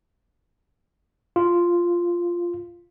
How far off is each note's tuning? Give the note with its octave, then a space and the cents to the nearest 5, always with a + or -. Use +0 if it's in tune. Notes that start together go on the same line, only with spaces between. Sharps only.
F4 -5